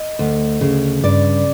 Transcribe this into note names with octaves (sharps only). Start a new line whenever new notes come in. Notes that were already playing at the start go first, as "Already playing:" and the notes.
Already playing: D#5
D2
C#3
G2 D5